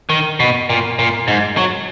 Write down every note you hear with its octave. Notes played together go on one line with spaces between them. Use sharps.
D#3
B2
A#2
A#2
G#2
F#3